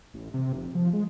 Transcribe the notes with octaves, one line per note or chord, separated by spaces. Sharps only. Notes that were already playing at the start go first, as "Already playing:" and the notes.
A1
C3
F1
F3
G#3